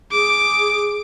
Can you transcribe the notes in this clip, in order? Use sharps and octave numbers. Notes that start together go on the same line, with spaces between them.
G#4 D6